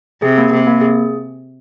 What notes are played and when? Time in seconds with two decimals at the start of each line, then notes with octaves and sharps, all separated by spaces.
0.22 C3 G#4
0.38 A#3
0.52 C3 A#3
0.67 A#3
0.81 G#4